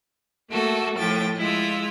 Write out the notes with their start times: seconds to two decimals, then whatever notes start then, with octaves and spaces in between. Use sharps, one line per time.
0.50 A3 A#3 F#4 A4
0.96 A2 F3 G5 A6
1.37 G#3 E4 F4 E6